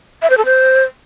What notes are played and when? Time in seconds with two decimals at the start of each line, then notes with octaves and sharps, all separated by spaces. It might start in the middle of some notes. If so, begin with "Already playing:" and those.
0.22 E5
0.30 C5
0.38 A4
0.45 C5